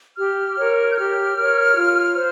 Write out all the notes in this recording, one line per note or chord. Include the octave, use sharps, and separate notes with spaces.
G4 F6
A#4 C#5
G6
G4 F6
A#4 C#5
F4
C5